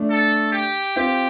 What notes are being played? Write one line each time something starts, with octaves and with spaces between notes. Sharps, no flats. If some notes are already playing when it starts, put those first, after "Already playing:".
Already playing: A3 D4
A4
G4
C4 F4 G4